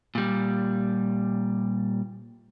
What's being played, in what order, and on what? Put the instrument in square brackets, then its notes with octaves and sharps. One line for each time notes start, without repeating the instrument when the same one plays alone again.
[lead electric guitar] A#2 G3